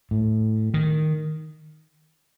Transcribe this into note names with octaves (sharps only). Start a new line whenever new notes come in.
A2
D#3